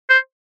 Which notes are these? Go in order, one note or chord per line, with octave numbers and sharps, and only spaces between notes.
C5